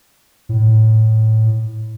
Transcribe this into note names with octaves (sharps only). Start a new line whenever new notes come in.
A2